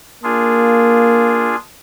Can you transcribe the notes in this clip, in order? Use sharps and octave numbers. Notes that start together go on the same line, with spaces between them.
A#3 D4 F4 G#4